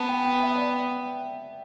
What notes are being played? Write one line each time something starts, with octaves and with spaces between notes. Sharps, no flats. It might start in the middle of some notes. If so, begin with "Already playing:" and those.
Already playing: B3 A5
G5
G5
E5
D5